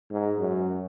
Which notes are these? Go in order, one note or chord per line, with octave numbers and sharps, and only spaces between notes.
G#2
F#2